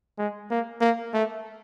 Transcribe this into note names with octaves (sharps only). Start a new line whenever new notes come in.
G#3
A#3
A#3
A3